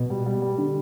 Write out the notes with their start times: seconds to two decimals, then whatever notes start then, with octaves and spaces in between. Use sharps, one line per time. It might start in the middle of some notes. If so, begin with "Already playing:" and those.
Already playing: B2
0.10 G3
0.26 G3
0.42 G3
0.58 D3